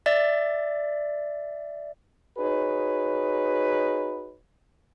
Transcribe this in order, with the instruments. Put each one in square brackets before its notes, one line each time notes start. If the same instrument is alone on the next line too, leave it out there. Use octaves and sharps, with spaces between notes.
[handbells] D5 E5 A6
[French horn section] D#4 F#4 G#4 B4 C#5